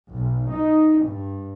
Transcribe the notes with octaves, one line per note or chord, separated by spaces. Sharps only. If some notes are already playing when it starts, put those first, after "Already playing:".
B1
D#4
G2